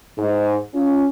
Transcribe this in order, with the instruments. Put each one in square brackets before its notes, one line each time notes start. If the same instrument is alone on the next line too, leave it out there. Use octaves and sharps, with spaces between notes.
[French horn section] G#2
C#4 F4